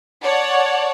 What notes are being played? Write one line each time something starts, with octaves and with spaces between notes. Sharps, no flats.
C#5 D5 F#5 A5